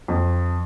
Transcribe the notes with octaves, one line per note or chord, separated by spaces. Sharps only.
F2